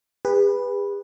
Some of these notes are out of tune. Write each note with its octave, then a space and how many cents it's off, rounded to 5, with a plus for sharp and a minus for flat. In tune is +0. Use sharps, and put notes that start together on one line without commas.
G#4 -45 B4 -5